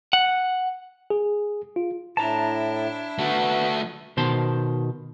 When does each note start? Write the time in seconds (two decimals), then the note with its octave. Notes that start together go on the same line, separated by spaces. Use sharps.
0.13 F#5
1.10 G#4
1.76 F4
2.17 A2 D4 E4 A5 A#5
3.19 A3 B3 F#4
4.17 B2 D#3 C5 A5 C6